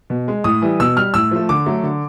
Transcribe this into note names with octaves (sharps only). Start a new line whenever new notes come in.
B2
G#3
A2 D#6
E3 G3
B2 E6
G3 F6
A2 E6
F3 A3
D3 D6
F#3 A3
D3